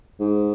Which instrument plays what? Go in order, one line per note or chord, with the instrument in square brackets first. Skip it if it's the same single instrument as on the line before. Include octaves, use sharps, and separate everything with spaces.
[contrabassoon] G#2